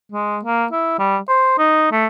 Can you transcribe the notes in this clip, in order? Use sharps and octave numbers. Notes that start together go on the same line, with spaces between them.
G#3
A#3
E4
G3
C5
D#4
A3